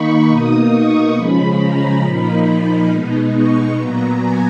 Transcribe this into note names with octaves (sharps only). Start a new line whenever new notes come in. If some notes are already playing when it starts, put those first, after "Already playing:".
Already playing: D#3 A#3 D#4 B5 C#6
B2 A#3 D#4 D#6
C#6
C#3 F3 G#3 C#4 B5
A#5
A#2 F3 A#3 D#4 B5
B2 G#3 B3 D#4
C#6
A#2 F#3 B3 A#5
G#5